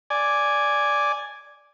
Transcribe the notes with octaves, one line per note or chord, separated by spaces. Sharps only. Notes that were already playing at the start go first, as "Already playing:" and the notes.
D5 G#5